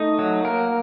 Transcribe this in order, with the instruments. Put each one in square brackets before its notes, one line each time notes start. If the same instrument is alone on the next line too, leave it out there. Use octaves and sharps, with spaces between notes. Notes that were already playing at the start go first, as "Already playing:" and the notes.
Already playing: [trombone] A3 [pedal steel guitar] D#4
[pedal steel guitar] F#3
[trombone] A#3 [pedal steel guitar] A#4